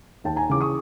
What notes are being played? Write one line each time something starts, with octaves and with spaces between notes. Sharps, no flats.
D#2 G5 A5
G#5 A#5
C#3 E3 D6
C#6 D#6